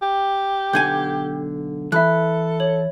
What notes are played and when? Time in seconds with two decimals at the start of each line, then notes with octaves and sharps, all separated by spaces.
0.02 G4
0.73 B1 D3 G#5 G6 G#6
1.92 E3 A4 E5 B5 F#6
2.60 C#5 F#7